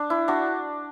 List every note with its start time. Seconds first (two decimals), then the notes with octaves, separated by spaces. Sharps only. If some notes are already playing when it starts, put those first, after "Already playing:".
Already playing: D4
0.10 E4
0.28 D4 F#4